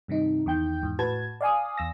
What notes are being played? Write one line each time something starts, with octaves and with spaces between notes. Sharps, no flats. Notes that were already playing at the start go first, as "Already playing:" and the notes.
G2 C3 D#3 D#4
E2 D#3 G5 G6
E2 G#2
A2 F#4 B4 A5 G#6
D5 F5 G#5 D#6
E2 E6 A#6